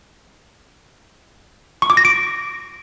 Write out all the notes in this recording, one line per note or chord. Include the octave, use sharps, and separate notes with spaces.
C#6
D6
A#6
D7